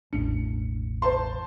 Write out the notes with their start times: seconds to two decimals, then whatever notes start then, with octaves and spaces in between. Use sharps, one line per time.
0.13 E1 A1 D4 C#7
1.02 C5 A5 C6